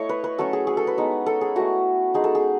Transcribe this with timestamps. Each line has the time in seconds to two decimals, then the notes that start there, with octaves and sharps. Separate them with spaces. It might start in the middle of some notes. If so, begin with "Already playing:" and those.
Already playing: A3 E4 C#5 D#5
0.09 B4
0.24 B4
0.38 F#3 A3 C#4 A4
0.53 G#4
0.67 G#4
0.77 A4
0.87 B4
0.98 G#3 B3 D#4
1.26 A4
1.41 G#4
1.56 A3 E4 F#4
2.14 G#3 D#4 G#4
2.24 A4
2.35 G#4